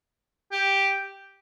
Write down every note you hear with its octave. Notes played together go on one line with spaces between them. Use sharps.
G4